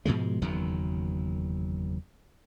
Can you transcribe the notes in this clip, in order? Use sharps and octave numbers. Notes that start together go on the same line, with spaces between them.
G#2 B2 F3 G#3
F#1 E2 D#3 F#3